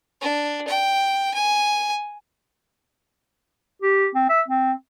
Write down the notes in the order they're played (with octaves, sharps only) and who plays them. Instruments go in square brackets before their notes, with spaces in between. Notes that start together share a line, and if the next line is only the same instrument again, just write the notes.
[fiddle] D4
G5
G#5
[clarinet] G4
C4
E5
C4